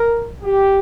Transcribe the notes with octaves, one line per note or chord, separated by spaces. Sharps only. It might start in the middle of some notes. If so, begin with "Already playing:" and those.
Already playing: A#4
G4